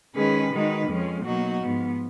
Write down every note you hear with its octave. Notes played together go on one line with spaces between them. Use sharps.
D#3 G#3 C#4 G#4 B4
D#3 G#3 D#4 F#4 B4
F2 F3 G#3 C#4
B2 F#3 A#3 D#4 F#4
G#2 F3 B3